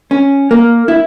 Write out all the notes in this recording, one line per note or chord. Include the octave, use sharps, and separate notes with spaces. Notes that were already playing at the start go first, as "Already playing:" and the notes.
C#4
A#3
E4